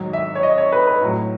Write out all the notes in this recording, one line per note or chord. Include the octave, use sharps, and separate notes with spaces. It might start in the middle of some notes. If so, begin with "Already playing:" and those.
Already playing: G#2 D#3 F#3
E5
C#5
D#5
C#5
B4
B4
A2 F#3